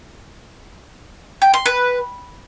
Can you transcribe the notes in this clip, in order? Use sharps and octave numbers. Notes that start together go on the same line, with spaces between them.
G5
C6
B4